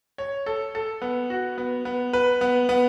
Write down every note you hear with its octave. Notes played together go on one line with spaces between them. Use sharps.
C#5
A4
A4
B3
F#4
B3
B3
B4
B3
B3